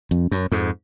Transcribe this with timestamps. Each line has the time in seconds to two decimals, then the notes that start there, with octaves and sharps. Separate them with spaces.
0.11 F2
0.31 F#2
0.52 F2 G#2